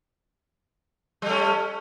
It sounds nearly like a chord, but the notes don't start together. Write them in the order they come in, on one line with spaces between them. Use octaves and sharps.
G3 A3 C#4